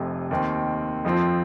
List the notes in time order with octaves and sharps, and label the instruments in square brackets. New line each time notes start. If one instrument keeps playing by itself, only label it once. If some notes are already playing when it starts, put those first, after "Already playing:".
Already playing: [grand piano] F1 F2 C3
D#2 D#3 C4
F2 F3 C4 F4